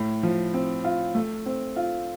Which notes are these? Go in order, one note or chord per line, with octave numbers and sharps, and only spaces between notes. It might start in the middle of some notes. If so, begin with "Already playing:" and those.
Already playing: A2
F3
C4
F4
A3
C4
F4